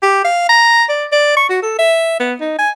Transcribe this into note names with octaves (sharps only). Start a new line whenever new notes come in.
G4
F5
A#5
D5
D5
C#6
F#4
A4
E5
B3
D#4
G#5